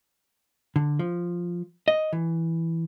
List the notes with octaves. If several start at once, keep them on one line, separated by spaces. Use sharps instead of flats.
D3
F3
D#5
E3